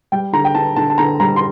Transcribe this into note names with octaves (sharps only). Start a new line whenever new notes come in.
G3 G5
D3 A#5
G5
D3 A5
D3 A5
A5
D3 A#5
G3 A#5
C6